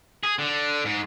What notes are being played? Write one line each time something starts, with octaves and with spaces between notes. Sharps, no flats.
G#4
D3
G#2